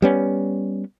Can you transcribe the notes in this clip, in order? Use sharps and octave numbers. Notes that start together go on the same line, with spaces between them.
G3 B3 C#4